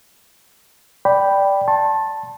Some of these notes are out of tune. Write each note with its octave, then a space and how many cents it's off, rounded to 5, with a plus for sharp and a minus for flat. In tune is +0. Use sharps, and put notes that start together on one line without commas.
D5 +0 G5 +0 B5 +0
A5 +0 C6 +45